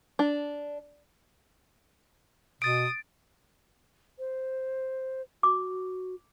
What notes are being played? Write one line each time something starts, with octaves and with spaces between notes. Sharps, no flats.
D4
B2 D#6 A6 D7
C5
F#4 D6